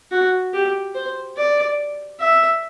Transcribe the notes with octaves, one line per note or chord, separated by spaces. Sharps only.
F#4
G4
C5
D5
E5